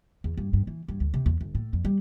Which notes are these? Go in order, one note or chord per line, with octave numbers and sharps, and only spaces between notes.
E2
G2
G2
E3
G2
D2
C3
E2
G1
A2
F2
G3